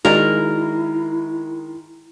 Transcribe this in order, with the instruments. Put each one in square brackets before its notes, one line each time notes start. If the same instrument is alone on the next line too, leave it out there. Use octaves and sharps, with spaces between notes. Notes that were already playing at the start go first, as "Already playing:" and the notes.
[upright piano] D#3 G#3 [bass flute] E4 [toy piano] F#4 D5 D#5 [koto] A#4